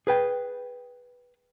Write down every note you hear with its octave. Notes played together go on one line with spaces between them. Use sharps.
G#4 B4 G5